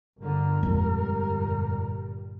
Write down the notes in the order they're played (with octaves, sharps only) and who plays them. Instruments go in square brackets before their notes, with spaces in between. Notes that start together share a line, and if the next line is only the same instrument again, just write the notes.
[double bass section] G1 D3 [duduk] A#4
[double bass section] G1 A#2 G3 [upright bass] F2 G#3